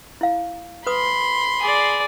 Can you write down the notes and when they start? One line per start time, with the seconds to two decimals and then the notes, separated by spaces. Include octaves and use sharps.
0.21 E4 F5
0.87 B4 B5 C6 D#6
1.61 G#4 D5